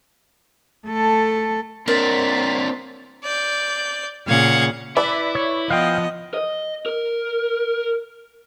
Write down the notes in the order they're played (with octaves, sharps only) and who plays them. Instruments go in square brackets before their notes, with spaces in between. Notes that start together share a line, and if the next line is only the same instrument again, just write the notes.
[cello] A3 A4
[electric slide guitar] C4 D4 [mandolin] A#4 [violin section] C6 A6 B6
[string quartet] D5 G6
A#2 C#3 F5 F#5 G#6
[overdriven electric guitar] E4 [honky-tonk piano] B4 D5 E5
[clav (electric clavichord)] C#5
[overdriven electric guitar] F3 [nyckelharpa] B3 D#5 [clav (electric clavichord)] F5 G5
[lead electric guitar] D#5
A#4